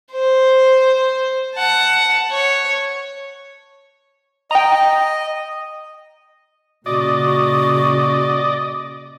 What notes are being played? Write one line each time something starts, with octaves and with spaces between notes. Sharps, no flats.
C5
F#5 A5
C#5
D#5 G5 A#5
A#2 C#3 F#4 D5 D#5